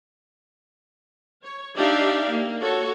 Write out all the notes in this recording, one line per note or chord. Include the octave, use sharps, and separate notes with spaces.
C#5
D4 D#4 G4 D5 E5 F5
A#3
F#4 A4 C#5